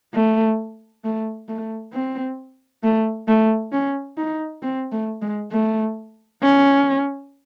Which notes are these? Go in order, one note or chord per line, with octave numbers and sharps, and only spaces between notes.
A3
A3
A3
C4
A3
A3
C#4
D#4
C4
A3
G#3
A3
C#4